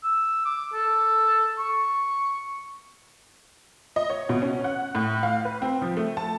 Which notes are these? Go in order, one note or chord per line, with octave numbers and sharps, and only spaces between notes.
E6
D6
A4
C#6
D#5
C#5
B2
C#4
F#5
A2
F5
B4
C4
F3
A3
A5